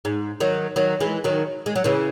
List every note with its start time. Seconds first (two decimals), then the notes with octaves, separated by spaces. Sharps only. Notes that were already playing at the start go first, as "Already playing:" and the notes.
0.05 G#2
0.40 D#3 F#3
0.76 D#3 F#3
1.00 E3 G#3
1.24 D#3 F#3
1.66 G#3
1.76 F#3
1.84 C#3 E3